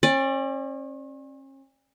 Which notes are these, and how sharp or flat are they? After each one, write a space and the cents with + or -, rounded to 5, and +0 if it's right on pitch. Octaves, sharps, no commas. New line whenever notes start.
C#4 -40 D5 +10